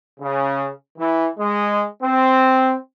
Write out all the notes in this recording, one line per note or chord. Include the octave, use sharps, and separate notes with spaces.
C#3
E3
G#3
C4